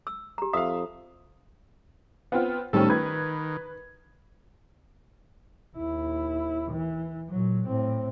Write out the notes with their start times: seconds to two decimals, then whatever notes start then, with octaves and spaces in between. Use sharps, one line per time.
0.07 E6
0.38 G4 A#5
0.53 F2 E5 F5 D#6
2.32 B3 C4 F4 F#5
2.73 A2 D#3 G3 A3 C4 C#4 A4
2.90 D#3 B4 G#6
5.76 D#2 E4
6.71 E3
7.29 A#2 F#3
7.67 A2 C4